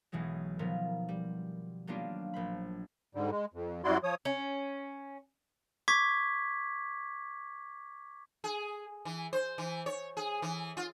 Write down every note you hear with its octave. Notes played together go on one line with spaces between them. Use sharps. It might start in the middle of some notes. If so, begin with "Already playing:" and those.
B1 B2 E3 F#3 G#3
B2 D#3 F3 B3 A#4
G3
F#3 G3 A#3 B3 D4 F4
A#1 C5 B5
G#2 D3 G3
G#3
F2
F#2 G3 E4 F#4 D5 C6
F3 C#5 D#6
C#4
C#6 D6 G#6 B6
G#4
E3
C5
E3
C#5
G#4
E3
F4